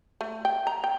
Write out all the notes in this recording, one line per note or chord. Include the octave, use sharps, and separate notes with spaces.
A3
G5
A#5
G5